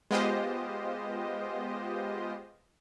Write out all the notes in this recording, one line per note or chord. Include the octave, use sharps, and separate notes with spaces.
G#3 B3 F4 G4 C5 D#5